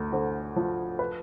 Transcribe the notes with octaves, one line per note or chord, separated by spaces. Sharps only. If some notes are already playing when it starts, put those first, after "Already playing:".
Already playing: D2
D3 C5
F3
B4